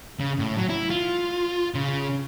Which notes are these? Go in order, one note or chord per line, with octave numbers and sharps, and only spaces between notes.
C#3
A2
F#3
E4
F4
C#3